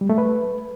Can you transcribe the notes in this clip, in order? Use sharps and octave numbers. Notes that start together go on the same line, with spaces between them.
G3
A3
B4